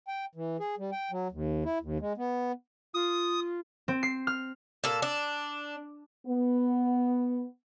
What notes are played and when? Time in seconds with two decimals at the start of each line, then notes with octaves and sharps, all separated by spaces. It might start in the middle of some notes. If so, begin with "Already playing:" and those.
0.08 G5
0.35 E3
0.60 G#4
0.78 G3
0.92 G5
1.11 F#3
1.32 D#2
1.65 E4
1.81 D#2
2.00 G#3
2.17 B3
2.94 F4 D#6
3.88 C4
4.03 C7
4.27 F6
4.84 A#2 A4
5.02 D4
6.27 B3